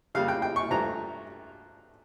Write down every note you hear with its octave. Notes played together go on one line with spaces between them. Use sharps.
F2 C#3 G3 A#3 F5
G5
G5
C#6
G2 F3 A3 A#5